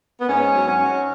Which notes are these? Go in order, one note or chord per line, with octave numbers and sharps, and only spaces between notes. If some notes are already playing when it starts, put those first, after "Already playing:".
B3
G#2 C#4
F#3
C#4
F#3